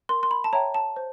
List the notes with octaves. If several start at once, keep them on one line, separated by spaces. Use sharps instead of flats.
A#4 C6
C6
B5
A5
C#5 E5 G5 A#5
A5
C5